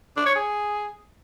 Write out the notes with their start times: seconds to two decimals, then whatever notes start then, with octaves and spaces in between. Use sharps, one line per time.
0.17 D4
0.26 C#5
0.35 G#4